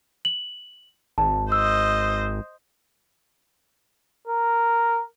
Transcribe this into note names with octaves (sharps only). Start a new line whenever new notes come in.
F#7
G#1 A5
C5 D#5 E6
A#4